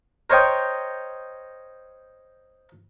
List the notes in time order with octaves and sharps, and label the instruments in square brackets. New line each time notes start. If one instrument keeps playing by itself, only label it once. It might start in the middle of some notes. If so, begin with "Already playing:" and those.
[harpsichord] A#4 C5 C#5 D#5 G5